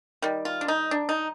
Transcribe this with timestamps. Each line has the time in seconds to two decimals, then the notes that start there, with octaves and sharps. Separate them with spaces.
0.22 D#3 G3
0.45 F4
0.61 D4
0.68 D#4
0.91 D4
1.09 D#4